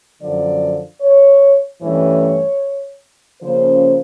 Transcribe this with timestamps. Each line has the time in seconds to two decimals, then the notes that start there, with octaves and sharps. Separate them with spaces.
0.21 F#2 D3 F3 D5
1.01 C#5
1.81 G2 E3 A3 C#4 C#5
3.41 C#3 F3 A#3 C#4 C5